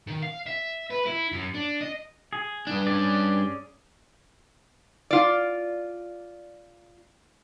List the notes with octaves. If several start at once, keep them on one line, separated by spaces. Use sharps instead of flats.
D#3
F5
E5
B4
E4
F#2
D4
D#5
G#4
G2 D4
C#4 G#4 D5
F4 D5